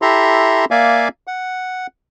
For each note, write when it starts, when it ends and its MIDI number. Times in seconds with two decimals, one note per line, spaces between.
0.02 0.65 64
0.02 0.65 67
0.02 0.65 69
0.02 0.65 76
0.02 0.65 82
0.02 0.65 84
0.71 1.08 58
0.71 1.08 74
0.71 1.08 76
0.71 1.08 77
0.71 1.08 80
1.27 1.87 78